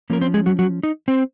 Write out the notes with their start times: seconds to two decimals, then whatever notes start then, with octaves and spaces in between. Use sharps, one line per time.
0.10 F3 A#3 C#4 A#4
0.21 C4 C5
0.34 G#3 G#4
0.46 F#3 F#4
0.59 F#3 F#4
0.83 D#4
1.08 C4 C5